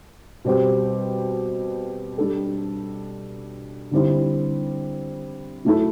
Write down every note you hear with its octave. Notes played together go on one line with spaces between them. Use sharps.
B2 G3 C4 G4
G3 D4 A4
D3 G3 C4 E4
F#3 A3 E4 A4